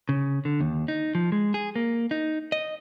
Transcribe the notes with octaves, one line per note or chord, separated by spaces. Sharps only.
C#3
D3
D#2
D#4
F3
G#3
G#4
A#3
D#4
D#5